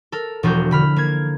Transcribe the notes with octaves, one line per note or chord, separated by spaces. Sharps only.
A4 A#4
E1 F3 D4 F#4 A#5 G6
D3 B5 F6
A#3 G#6